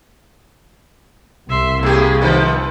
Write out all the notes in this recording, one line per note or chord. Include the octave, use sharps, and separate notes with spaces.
C2 E5 C6
A2 A#3 G4 G#4
D3 D#3 F3 B4